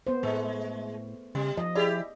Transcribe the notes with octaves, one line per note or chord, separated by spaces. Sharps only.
B3 C5
A2 G#3 A3
C#3 G3
F3 D#5
E4 G4 G#4 D5